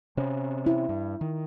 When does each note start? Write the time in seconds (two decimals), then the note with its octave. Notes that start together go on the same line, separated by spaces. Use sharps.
0.17 C3 C4 C#4
0.66 E4
0.89 G2
1.21 D#3